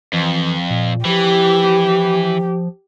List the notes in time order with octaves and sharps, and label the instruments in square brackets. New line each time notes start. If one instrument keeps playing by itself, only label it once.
[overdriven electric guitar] F2 [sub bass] E3
[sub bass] A#2
[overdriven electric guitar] E3 [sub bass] F3 [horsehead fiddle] G4